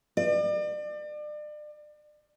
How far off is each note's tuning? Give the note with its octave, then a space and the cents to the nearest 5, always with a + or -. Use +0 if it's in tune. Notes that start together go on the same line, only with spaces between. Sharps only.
D5 +35